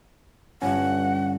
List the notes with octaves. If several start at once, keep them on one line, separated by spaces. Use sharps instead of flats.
G1 G2 C#4 F#5